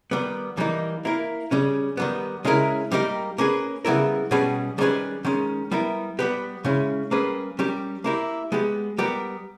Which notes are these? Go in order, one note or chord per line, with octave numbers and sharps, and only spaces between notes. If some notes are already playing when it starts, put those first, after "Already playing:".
D#3 G3 B3
E3 G3 A#3 D#4
A#3 E4 A#4
C#3 G3 C#4
D#3 G3 B3
C#3 G#3 C#4 E4 A#4
G3 A#3 D#4 G4 A#4
A#3 C#4 G#4 B4
C#3 G3 B3 E4 A#4
B2 G3 C#4 G#4 B4
D#3 G3 C#4 G#4 B4
D#3 G#3 C#4
G3 B3 E4 A#4
G3 B3 G4 B4
C#3 G#3 C#4 E4
G3 A#3 C#4 G#4 B4
G3 C#4 G4 A#4
A#3 E4 G4 A#4
G#3 B3 G4
G3 B3 G4 A#4